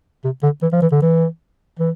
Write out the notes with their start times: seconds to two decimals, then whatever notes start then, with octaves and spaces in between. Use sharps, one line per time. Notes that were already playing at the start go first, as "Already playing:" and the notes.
0.24 C3
0.43 D3
0.62 E3
0.73 F3
0.82 E3
0.92 D3
1.02 E3
1.79 E3